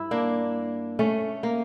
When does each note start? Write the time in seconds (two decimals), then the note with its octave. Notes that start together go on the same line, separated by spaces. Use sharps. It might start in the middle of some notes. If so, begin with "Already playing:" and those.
Already playing: G2 E4
0.11 A#3 D4
0.99 A3 C#4
1.43 A#3